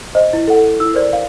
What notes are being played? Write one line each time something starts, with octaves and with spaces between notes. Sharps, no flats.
C5 D#5
E4
A4 F#5
E4 E6
A#4 C5 D5
F5